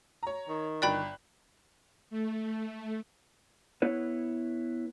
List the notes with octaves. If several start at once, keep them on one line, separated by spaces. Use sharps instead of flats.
C#5 A#5
D#3
G1 D5 G5 B5 F#6
A3
B3 E4 B4 C#5